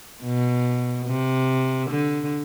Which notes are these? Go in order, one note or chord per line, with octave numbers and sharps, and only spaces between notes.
B2
C3
D3